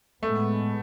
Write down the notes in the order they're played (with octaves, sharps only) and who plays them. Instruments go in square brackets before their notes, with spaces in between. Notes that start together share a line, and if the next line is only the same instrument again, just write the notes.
[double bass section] A2 G#3 B3 [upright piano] A3